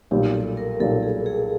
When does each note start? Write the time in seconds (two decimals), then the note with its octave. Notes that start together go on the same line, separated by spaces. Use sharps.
0.11 B1 A#2 G3 G4
0.34 A4
0.57 A#4
0.80 B1 A#2 G3 A4
1.03 G#4
1.26 G#4